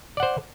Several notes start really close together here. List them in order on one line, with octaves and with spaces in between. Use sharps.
D5 F#5 C5